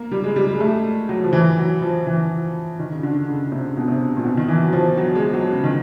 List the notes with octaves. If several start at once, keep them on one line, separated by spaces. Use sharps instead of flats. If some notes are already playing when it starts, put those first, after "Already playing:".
Already playing: A#3
G3
G#3
G3
G#3
A3
F#3
F3
E3
F#3
F3
E3
D#3
C#3
D3
C#3
C#3
C3
B2
C3
A#2
B2
D#3
E3
F#3
F3
F#3
G#3
F#3
C#3
D#3